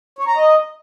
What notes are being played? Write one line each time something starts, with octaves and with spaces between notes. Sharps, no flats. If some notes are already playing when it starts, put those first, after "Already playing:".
C#5
A#5
D#5